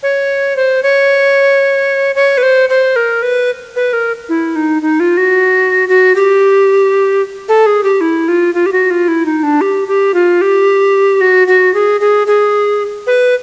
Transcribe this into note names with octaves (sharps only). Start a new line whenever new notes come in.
C#5
C5
C#5
C#5
B4
C5
C5
A#4
B4
B4
A#4
E4
D#4
D#4
F4
F#4
F#4
G4
A4
G#4
G4
E4
F4
F4
G4
F#4
F4
E4
D#4
D4
G4
G4
F4
G4
F#4
F#4
G#4
G#4
G#4
B4